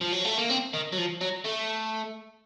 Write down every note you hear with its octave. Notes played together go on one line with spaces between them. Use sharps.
F3
F#3
A3
A#3
C4
D#3
F#3
F3
F#3
A3